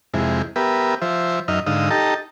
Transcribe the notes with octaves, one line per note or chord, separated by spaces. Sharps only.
F2 C3 G#3 E4
B3 G4 A#4 B4 E5
F3 C5 E5
F#2 D#4 D#5 E5 F6
G#2 D3 D#4 F5 D#6 E6
D#4 G4 A4 D#5 A5 A#5